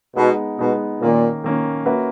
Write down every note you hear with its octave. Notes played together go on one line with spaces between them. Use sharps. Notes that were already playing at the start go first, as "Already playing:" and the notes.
B2 G#3 B3 D#4
B2 G#3 B3 D#4
A#2 D#3 A#3 C#4
D#3 A#3 C#4
A#3 C#4 F#4 B4 E5